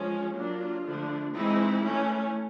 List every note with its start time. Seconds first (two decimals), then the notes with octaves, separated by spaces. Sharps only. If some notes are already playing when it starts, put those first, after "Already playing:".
Already playing: F3 G#3 C#4
0.35 F#3 A#3 D4 F4
0.84 D3 F3 A3 D4
1.33 E3 G#3 C4 D#4 E4
1.83 E3 A3 C#4